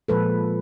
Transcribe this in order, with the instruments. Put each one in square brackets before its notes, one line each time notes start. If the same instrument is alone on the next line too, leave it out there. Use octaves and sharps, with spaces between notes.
[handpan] A#2 F3 G#3 A4 B4